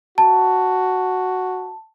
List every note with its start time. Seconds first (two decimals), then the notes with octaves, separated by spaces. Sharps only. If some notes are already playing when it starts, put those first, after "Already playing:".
0.18 F#4 A5